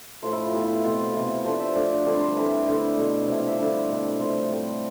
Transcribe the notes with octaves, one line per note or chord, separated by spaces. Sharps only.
A2 F3 A3 C5
E4
F4
A2 E3 B3 G4
E4
F4
B2 A3 C4 F4
C3 E3 B3
F3 A3 D4 C5
E5
F3 A3 D4 D5
D3 G3 C4 D5
C5
E3 A3 C4 B4
D3 A3 E4 C5
B2 A3 E4
C3 F3 C4 E4 D5
F5
E5
D3 G3 D4
B2 A3 C4 E4
D5
C3 F3 A3 C5
A2 G3 C4